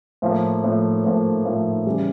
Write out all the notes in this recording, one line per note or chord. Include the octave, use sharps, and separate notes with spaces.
A2 F3 A#3
A2 F3 A#3
A2 F3 A#3
A2 F3 A#3
C#3 E3 G3